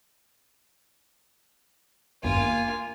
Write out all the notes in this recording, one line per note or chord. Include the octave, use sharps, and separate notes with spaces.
G#1 E2 G2 A#3 F4 G#5